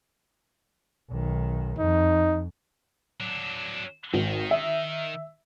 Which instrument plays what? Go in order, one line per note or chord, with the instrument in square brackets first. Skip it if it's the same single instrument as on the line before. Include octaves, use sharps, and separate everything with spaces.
[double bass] B1 D#3
[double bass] F2 [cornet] D#4
[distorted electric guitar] F#3 D4
[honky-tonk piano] G#1 [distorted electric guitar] D#3
[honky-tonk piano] E5